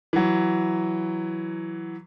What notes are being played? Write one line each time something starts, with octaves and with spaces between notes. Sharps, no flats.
E3 F#3